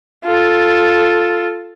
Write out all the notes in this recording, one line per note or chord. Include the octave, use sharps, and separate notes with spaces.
F4 A4